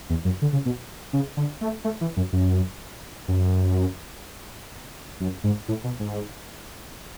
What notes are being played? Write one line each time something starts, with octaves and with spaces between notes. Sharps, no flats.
E2
F#2
D3
C#3
B2
C#3
D3
A3
A3
E3
F#2
F#2
F#2
F#2
G#2
A2
B2
G#2